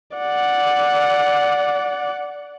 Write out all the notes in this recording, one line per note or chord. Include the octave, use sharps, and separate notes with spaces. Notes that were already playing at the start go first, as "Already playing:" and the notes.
D5 F#5